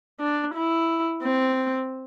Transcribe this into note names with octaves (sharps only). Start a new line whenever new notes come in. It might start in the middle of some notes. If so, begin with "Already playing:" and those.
D4
E4
C4